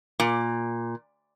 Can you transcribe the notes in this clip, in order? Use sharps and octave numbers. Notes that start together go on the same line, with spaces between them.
A#2